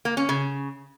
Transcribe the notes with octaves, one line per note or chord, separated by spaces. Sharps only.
A#3
C#4
C#3